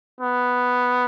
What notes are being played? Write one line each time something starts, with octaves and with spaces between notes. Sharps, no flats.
B3